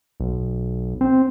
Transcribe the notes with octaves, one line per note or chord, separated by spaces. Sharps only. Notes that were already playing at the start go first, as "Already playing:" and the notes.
B1
C4